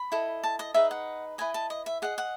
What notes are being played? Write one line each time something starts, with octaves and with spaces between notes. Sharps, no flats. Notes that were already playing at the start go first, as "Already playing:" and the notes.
Already playing: B5
E4 A4 D#5
A5
D#5
D#4 G#4 B4 D#5 E5
F#5
E4 B4 D#5 G#5
A5
D#5
E5
G#4 D#5 F#5
F#5